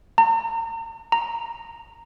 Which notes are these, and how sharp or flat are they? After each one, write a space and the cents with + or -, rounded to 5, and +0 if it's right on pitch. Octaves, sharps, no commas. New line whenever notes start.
A#5 -40
A#5 -5